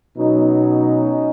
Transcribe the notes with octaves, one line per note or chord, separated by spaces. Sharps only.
B2 F#3 C#4 D#4